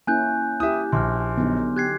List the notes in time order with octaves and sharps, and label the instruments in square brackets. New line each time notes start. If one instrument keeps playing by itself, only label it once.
[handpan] A#3 C#4 E4 [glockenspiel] G#5 F#6 G6
[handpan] E4 G4 [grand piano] E5 D#6
[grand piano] A#1 [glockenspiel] C6 D6 F6
[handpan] D3 F#3 D#4 [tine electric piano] B3
[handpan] G4 [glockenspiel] F#6 G#6 C7